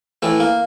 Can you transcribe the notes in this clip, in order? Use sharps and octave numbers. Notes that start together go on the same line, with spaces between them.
A2 E3 A3
A#3